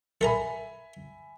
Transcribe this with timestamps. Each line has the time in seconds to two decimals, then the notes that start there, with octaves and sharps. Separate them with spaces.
0.21 A4 A#4 E5 G#5 A#5 B5